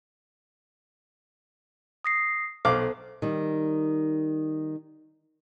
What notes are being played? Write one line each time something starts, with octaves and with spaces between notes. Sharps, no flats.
D#6 A#6 C7
B1 A4 C5 F5 D6
D#3 G3